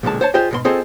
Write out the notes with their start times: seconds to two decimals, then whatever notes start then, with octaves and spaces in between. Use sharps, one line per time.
0.03 B1 A#2 D3 G#3 A5
0.21 C5 C#5 A5
0.34 F4 G4 G#4 C5 D#5 G5
0.51 G#2 B2 C6
0.65 C4 F4 G#4 A4 C5 D#5